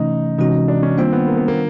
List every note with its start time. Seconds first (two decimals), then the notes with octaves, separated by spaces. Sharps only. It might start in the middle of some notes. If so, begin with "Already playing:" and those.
Already playing: C3 E3 A3 C#4 D#4
0.38 C3 E3 G#3 C#4 D#4 F#4
0.68 D4
0.83 C#4
0.98 D#3 G3 A#3 C4 D4 F4
1.13 B3
1.28 A#3
1.37 B3
1.48 A#3